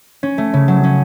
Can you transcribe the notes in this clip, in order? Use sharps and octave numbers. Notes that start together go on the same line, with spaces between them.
C#4
A3
C#3
F#3
C#4